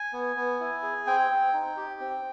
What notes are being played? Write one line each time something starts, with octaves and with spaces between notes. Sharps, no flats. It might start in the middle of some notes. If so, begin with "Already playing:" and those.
Already playing: G#5
B3
B3
E4
G#4
C4 G5
C4
D#4
G4
C4